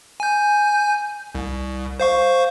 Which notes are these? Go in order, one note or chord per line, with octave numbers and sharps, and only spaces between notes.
G#5 G6
C2
C5 F5 C#6